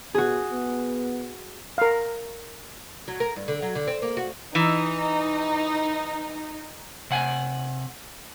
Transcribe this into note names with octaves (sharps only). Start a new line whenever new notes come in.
B2 F#4 G#4
B3
A#4 F5
F#3
A#4
G2
D3
F#3
D3
C4
A#3
F#4
E3 D#4
C3 F#5 G#5